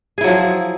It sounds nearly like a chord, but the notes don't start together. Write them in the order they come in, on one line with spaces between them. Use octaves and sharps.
G#4 E4 F#3 F3